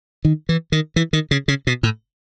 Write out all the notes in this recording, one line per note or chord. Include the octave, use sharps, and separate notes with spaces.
D#3
E3
D#3
E3
D#3
C#3
C#3
B2
A2